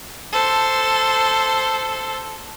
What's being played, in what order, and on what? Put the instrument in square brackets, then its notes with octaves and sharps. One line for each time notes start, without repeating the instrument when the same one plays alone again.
[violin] A4 C5